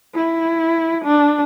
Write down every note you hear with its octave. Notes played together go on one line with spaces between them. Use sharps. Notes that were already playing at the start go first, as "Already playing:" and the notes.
E4
D4